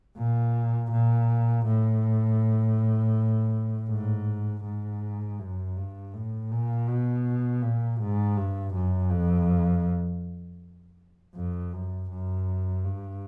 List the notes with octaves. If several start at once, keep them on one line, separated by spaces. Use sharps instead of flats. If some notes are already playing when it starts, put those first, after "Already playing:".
A#2
A#2
A2
G#2
G#2
F#2
G2
A2
A#2
B2
A#2
G#2
G2
F#2
F2
F2
F#2
F#2
G2